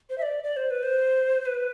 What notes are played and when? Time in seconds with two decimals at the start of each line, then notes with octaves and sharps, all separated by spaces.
0.10 C5
0.18 E5
0.22 D5
0.44 D5
0.57 C5
0.71 B4
0.83 C5
1.46 B4